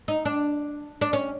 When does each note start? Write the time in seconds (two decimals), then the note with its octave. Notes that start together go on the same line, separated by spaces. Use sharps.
0.08 D#4
0.25 D4
1.01 D4
1.13 C#4